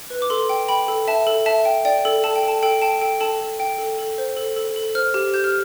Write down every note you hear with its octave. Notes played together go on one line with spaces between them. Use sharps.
B4
D6
A4 C6
G5
G5 B5
A4
E5 A5
A4
E5 A5
G5
D5 G5
A4
A4 A5
G5
A4 A5
A4 G5
G5 A5
A4 G5
A4 A5
A4
G5
A4
A4
C5
A4
A4
A4
C5 F6
G4
G4 G6
F6